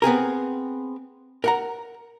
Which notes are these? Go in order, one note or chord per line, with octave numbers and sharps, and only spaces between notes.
B3 C4 G#4 A#4
A#4 F#5 A#5